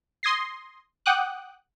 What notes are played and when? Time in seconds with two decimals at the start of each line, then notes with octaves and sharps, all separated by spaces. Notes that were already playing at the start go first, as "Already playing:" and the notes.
0.23 C6 D#6 G#6 A#6 C7
1.06 F#5 G5 D6 D#6 F#6